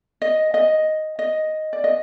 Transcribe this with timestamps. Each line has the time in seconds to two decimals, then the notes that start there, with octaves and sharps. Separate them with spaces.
0.22 D#5
0.54 D#5
1.19 D#5
1.73 D5
1.84 D#5